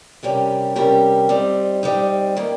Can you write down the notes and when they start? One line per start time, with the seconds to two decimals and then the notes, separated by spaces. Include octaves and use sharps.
0.23 C3 G3 C#4 G4 A#4
0.76 C3 G3 C#4 G4 A#4
1.29 G3 C4 D#4
1.83 G3 C4 D#4
2.37 D#3 G3 A#3